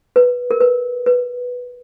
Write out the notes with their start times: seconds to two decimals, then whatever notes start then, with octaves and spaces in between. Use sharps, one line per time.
0.16 B4
0.51 A#4
0.60 B4
1.06 B4